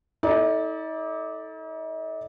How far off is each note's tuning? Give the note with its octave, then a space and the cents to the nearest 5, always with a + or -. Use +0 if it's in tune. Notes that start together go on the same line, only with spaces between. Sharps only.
D#4 +45 A4 +0 D5 +0